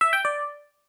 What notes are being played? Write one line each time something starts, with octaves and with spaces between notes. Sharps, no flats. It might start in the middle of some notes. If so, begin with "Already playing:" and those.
E5
G5
D5